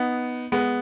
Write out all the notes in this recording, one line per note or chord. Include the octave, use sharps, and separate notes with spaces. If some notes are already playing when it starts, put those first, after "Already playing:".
Already playing: B3 D#4
G#3 B3